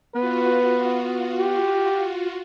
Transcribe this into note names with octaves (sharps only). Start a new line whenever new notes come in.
B3 F4 F#4 B4
G4